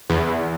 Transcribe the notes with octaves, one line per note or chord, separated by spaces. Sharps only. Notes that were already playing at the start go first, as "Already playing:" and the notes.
E2